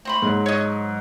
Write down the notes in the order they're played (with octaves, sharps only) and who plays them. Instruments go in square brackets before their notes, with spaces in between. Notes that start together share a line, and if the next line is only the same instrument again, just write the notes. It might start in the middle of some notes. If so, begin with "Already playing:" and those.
[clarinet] A3 [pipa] C4 C5 B5
[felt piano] G#2 [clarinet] F#3
[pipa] C#5 D#5